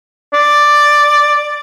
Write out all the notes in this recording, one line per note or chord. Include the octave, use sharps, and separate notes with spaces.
D5